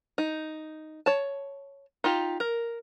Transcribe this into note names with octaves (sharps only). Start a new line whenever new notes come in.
D#4
C#5 A5
D#4 F4 G4
A#4